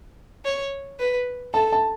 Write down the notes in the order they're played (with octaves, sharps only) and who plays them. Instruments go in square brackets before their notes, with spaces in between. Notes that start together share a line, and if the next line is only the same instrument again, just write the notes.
[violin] C#5
B4
[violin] A4 [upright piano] A5
[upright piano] A5